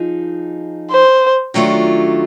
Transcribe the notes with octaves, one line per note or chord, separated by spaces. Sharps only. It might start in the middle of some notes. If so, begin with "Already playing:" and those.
Already playing: F3 D#4 G#4
C5
D#3 F#3 A3 D4 F4